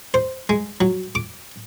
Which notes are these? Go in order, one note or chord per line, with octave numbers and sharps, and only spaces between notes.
C5
G#3
F#3
D6